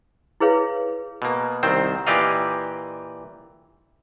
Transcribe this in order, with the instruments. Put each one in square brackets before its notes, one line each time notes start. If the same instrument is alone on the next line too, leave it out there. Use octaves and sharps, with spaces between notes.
[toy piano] E4 G#4 B4 C#5 F5
[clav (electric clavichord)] B2 A#3
C2 D#3 C4 C5
A#2 E3 G4 D5 D#5 F5